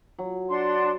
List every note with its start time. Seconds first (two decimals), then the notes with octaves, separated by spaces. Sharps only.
0.19 F#3
0.49 D4 F#5 C6